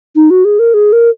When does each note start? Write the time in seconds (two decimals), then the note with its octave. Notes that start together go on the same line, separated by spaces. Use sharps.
0.16 D#4
0.30 F#4
0.45 G#4
0.59 A#4
0.74 G#4
0.93 A#4